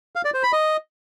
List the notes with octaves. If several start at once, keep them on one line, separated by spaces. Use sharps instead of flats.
F5
D5
C5
B5
D#5